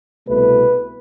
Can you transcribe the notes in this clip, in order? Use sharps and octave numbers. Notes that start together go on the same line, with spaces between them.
C2 B2 A3 B4